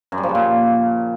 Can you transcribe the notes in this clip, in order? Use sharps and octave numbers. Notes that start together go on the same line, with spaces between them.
F#2
G3
F3
C#3
A#2